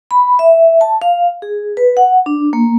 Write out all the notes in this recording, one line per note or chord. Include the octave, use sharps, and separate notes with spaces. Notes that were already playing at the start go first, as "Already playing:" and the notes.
B5
E5
A5
F5
G#4
B4
F#5
D4
A#3